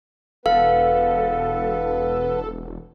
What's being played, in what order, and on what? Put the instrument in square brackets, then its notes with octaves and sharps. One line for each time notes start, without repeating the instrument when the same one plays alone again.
[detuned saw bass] E1 [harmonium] B3 B4 [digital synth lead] A4 [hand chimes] F5